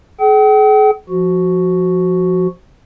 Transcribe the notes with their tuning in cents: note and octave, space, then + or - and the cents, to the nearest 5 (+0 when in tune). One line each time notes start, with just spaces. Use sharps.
G#4 +40 G5 -40
F3 +0 F#4 +0